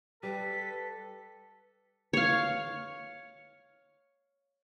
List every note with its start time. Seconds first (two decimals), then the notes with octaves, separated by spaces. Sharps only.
0.23 G3 A4 B4 B6
2.13 C#5 F5